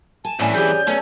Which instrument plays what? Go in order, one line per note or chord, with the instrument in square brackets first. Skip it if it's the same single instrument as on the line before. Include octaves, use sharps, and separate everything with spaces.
[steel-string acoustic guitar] G#5 [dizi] A5
[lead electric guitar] C2 E3 [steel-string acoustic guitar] A2 A3 [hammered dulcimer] C#4 D5
[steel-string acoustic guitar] G4 G#4 [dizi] G6
[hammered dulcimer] A3 A4 [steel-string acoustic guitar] B3 [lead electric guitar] C#4